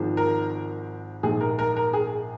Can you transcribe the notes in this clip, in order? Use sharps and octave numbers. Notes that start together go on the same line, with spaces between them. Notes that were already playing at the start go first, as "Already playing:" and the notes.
Already playing: G#1 G#2 F3 G#3
A#4
A#1 G#2 G#3 G#4
A#4
A#4
A#4
G#4